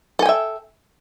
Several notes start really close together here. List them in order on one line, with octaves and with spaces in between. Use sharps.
A4 G#5 G5 E5